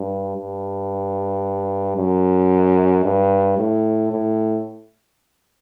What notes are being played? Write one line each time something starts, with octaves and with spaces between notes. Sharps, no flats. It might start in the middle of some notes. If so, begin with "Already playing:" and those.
Already playing: G2
G2
F#2
G2
A2
A2